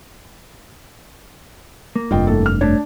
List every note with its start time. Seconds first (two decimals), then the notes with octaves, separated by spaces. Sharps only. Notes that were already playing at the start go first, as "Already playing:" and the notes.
1.96 A#3
2.11 F1 G2 F4 D#5 G5
2.27 A2 A4
2.46 F6
2.61 A3 D4 C#5